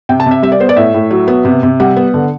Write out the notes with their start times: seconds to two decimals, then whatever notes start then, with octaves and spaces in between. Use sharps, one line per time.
0.09 C3 G5
0.20 A5
0.26 C3 E5
0.43 G3 E5
0.52 D5
0.60 B3 C5
0.69 D5
0.76 A2 E5
0.94 A2
1.11 F#3
1.28 B3
1.45 C3
1.63 C3
1.80 G3 F#5
1.96 B3
2.14 D3